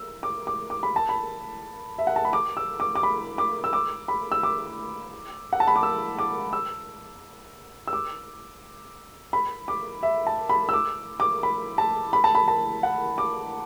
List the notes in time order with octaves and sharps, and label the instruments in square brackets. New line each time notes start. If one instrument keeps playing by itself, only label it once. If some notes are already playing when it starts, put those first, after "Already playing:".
Already playing: [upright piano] E6
D6
D6
D6
B5
A5
B5
E5
F#5
A5
B5
D6
E6
D6
D6
B5
D6
E6
D6
B5
E6
D6
F#5
A5
B5
D6
E6
D6
E6
E6
D6
B5
D6
E5
A5
B5
E6
D6
D6
B5
A5
B5
A5
B5
A5
F#5
D6